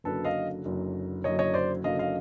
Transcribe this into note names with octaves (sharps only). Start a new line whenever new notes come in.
F#1 F#2 D3 F#3 A4 B4
D#5 F5
F#1 F#2 D3 F#3
F#1 F#2 D3 F#3 C#5 D#5
C#5 D#5
C5 D5
F#1 F#2 D3 F#3 D#5 F5
D#5 F5